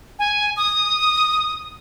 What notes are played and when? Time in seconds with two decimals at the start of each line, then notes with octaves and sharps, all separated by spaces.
0.19 G#5
0.57 D#6